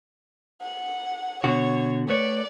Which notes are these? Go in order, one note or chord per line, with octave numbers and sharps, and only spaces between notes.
F#5
B2 D3 F#4 C#5
A3 B4 C#5 D5